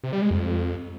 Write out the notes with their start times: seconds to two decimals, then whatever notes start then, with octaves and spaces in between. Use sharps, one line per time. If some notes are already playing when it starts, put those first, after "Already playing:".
0.04 C3
0.13 G3
0.22 G#3
0.31 F2